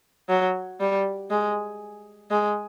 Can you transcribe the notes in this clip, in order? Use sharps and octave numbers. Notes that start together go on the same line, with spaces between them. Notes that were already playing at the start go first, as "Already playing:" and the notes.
F#3
G3
G#3
G#3